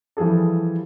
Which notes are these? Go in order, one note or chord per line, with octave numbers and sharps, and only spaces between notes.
E3 F3 G3 G#4 A4